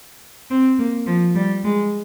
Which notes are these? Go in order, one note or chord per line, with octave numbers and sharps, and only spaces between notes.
C4
A#3
F3
G3
G#3